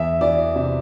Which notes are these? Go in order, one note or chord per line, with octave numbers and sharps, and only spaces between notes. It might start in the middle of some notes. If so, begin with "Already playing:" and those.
Already playing: E2 E5
E3 D5
C3 E5